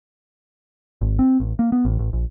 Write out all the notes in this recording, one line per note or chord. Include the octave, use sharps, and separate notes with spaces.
G#1
C4
A1
A#3
B3
A1
A1
A#1